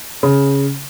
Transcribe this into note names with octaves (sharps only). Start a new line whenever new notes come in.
C#3